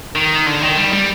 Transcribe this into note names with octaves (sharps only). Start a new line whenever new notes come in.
D#3
D3
D#3
G3
G3